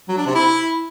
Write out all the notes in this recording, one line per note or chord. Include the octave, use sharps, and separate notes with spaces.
F#3
D4
C3
E4